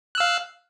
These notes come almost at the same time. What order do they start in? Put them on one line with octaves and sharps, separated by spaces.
F#6 E6 F5